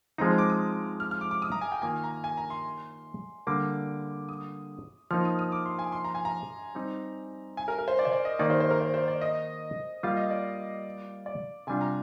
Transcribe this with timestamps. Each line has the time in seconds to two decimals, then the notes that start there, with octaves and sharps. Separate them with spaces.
0.18 F3 G#3 C4 D#4 A#5
0.38 D6
0.50 D#6
1.00 F6
1.11 F6
1.21 D6
1.31 D6
1.42 D#6
1.52 A#5
1.61 G#5
1.72 G5
1.82 D#3 A#3 F4 G#5
2.04 A#5
2.24 G#5
2.37 A#5
2.50 C6
3.47 D3 G3 A#3 D6
4.29 D#6
5.11 F3 A#3 D#4 F6
5.25 D#6
5.39 D#6
5.52 D6
5.66 C6
5.79 G#5
5.92 C6
6.04 A#5
6.15 G#5
6.25 A#5
6.75 G3 C4 D#4
7.57 G#5
7.68 A#4
7.78 A#4
7.88 C5
7.99 D5
8.05 C5
8.13 D5
8.25 D#5
8.39 D#3 A#3 D#4 D5
8.50 C5
8.60 C5
8.70 A#4
8.81 C5
8.94 C5
9.08 D5
9.21 D#5
10.03 G3 A#3 F4 F5
10.17 D#5
10.30 D5
11.26 D5
11.67 C3 G3 D4 F4 G#5
11.81 A#5